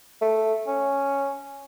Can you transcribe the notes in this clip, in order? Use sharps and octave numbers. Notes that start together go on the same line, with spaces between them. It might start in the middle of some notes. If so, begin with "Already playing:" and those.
A3
C#4